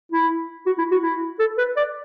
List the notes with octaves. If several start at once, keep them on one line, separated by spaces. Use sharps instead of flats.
E4
F#4
E4
F#4
E4
A4
B4
D5